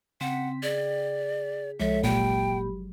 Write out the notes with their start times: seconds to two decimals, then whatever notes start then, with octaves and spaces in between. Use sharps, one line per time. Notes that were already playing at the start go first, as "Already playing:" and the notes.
0.21 C#3 C4 F#5 G5 B6
0.63 G#4 D5
1.80 C2 F3 G#3 A4 C#5 E5
2.04 G1 A#2 F#3 G4 G5 B5